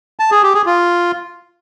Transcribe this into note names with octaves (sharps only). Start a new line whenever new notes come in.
A5
G#4
G4
G#4
F4